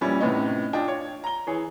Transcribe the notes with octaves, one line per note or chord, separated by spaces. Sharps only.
A#2 E3 F3 G3 C#4 E4
A2 C3 B3 C#4 D#4
D4 F4 D#5 G5
C#5
A#5 G7
E3 G#4 C#5